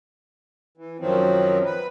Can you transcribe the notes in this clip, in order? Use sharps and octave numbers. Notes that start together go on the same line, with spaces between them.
E3
F#2 D#3 F3 F#3 C4
B4